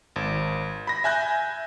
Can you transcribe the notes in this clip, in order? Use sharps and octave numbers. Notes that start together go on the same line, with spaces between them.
G#1
B5 A#6
E5 G#5 F#6 G6 A#6